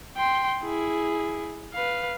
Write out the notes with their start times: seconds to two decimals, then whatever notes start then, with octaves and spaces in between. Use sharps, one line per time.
0.17 G5 C6
0.63 E4 G#4
1.73 B4 F5